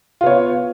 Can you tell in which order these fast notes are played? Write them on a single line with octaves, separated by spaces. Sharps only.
F4 B3 C#5